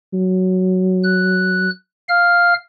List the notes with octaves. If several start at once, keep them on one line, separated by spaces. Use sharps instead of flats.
F#3
F#6
F5 F6